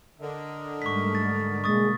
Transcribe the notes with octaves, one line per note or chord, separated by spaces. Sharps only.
D3 A#4 D#5
G#2 G3 A3 C#6 B6
A6
B2 G#3 A#3 C#6 D#6 A6